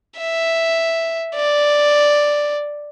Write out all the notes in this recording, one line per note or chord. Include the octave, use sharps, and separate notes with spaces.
E5
D5